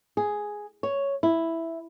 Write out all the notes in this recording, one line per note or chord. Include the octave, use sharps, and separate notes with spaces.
G#4
C#5
E4